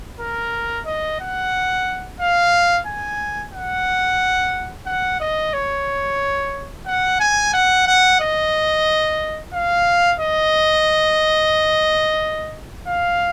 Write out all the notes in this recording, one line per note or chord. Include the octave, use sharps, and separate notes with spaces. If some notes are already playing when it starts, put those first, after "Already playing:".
A#4
D#5
F#5
F5
G#5
F#5
F#5
D#5
C#5
F#5
G#5
F#5
F#5
D#5
F5
D#5
F5